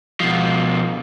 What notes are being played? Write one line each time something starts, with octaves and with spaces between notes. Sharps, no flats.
B2 F3